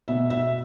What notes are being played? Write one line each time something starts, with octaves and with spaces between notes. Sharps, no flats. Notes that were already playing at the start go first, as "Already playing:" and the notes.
B2 E5
E5